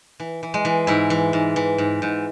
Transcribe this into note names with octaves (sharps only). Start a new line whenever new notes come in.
E3
E3
G#3
E3
G#2 E4
E3
G#2
E3
G#2
G#2